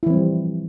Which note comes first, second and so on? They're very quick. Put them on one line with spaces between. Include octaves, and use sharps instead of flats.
E4 E3 C4 G3 F3